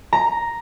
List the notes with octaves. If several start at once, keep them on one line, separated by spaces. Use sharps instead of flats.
A#5